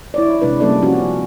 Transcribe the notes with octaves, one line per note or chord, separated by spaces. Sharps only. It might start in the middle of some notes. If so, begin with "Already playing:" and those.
E4 C#5 D5
C3 G#3 D4 B4
G3 A#3 C#4 A4 D5
F3 C4 C#4 F#4